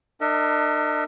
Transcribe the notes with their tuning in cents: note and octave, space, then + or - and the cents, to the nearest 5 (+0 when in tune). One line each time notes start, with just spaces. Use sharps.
D4 +40 A#4 -40 E5 -45